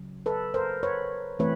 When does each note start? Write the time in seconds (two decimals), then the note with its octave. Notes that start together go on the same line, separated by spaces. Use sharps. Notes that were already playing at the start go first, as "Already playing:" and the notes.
Already playing: C#3 F#3
0.26 A4 B4
0.54 A#4 C5
0.83 B4 C#5
1.39 E3 A3 C4 B4 C#5